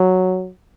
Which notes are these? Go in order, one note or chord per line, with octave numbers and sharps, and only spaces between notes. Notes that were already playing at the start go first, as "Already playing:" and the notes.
Already playing: F#3